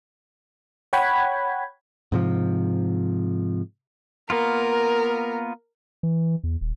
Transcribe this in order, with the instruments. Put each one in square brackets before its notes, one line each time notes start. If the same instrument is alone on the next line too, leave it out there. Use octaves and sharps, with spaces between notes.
[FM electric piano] C#5 F#5 G5 B5 G#6
[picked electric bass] G#2 C3 F3
[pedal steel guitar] A#3 B3 F4 [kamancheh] A#4
[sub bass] E3
E2
D#1